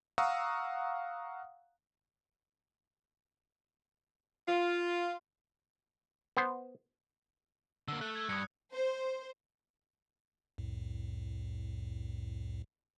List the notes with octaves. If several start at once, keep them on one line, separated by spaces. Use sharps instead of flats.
F5 F#5 A#5 C#6 D#6 E6
F4
B3 C5
D3 A#3 E6
A3 F#6
G#6
G2 D#6 G#6 C#7
C5
C2 F2 A2